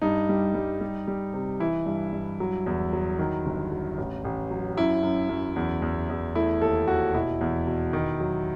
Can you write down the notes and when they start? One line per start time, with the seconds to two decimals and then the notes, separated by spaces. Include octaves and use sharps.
0.02 G2 D#4
0.29 G3
0.54 G3
0.81 G3
1.07 G3
1.34 C3
1.60 E3 E4
1.86 G2
2.13 G2
2.40 F#3
2.66 E2
2.93 F#3
3.19 D#3
3.45 G1
3.72 F#3
3.98 A1
4.24 A1
4.51 F#3
4.77 F#2 E4
5.03 F#2
5.29 F#2
5.56 E2
5.82 E2
6.10 E2
6.35 A3 E4
6.62 D#2 A4
6.88 D#2 F#4
7.14 B2 E4
7.41 E2
7.67 B2
7.93 D#3
8.20 F#3